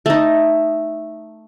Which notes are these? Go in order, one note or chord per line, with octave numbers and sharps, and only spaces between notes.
A3 D#4